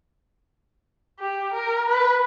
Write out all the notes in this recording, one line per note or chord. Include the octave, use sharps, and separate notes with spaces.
G4
A#4
B4